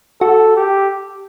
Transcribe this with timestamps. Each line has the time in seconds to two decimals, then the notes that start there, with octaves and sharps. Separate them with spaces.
0.21 F#4 A4
0.56 G4